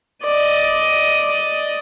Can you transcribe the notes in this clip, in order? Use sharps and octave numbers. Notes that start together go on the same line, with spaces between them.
D5 D#5